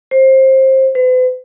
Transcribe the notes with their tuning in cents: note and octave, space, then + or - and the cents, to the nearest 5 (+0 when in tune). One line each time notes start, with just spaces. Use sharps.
C5 +20
B4 +45